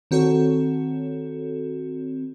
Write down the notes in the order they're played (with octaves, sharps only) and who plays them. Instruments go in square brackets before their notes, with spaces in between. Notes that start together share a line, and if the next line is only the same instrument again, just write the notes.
[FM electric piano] D#3 C4 F#4 A4 C#5